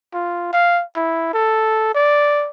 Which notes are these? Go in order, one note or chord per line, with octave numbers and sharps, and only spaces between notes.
F4
F5
E4
A4
D5